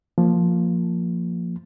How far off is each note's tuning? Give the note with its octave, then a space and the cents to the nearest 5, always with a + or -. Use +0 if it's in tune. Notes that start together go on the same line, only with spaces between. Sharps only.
F3 +0 A#3 -10